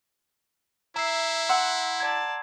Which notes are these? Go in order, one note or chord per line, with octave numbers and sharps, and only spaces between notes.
E4 E5 A#5 E6 C7
F#5 C6 E6
D5 A5 G#6